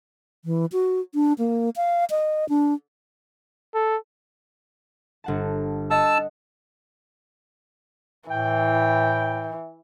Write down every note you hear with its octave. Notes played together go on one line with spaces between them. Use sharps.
E3
F#4
D4
A#3
F5
D#5
D4
A4
G1 F#5 A5
D#5 F#5 A5 E6
A2 E3 G5